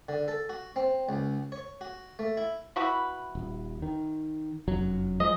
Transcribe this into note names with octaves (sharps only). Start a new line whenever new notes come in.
D3
A4
F#4
C4
C#2
C#5
F#4
A3
E4
E4 F#4 B4
D#1
D#3
F1 F#2 F#3
F3 G#3 D#5